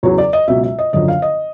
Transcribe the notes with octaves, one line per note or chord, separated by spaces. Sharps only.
E2 C#3 F#3 C#5
D5
D#5
C#2 B2 F#3 E5
E5
D#5
F#1 F#2 D3 F3 D#5
F5
D#5